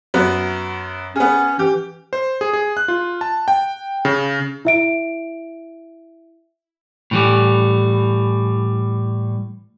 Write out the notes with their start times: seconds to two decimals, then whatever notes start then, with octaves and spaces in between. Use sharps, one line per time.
0.14 F#2 B3 F#4
1.16 B3 C#4 G#4
1.59 E3 G4
2.13 C5
2.41 G#4
2.53 G#4
2.77 F#6
2.88 F4
3.21 A5
3.48 G5
4.05 C#3
4.65 E4 E5 D7
7.11 A2 E3 G3